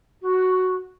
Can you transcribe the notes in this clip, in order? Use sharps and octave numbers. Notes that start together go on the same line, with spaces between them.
F#4